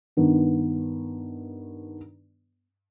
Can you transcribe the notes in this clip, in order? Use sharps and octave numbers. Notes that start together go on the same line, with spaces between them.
G2 D#3 B3